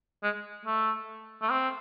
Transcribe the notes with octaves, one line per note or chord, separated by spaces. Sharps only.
G#3
A3
A3
C4